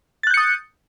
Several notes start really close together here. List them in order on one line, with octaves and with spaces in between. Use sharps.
A6 F#6 G6 C#7 D#6